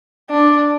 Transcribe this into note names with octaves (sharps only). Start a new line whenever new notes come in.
D4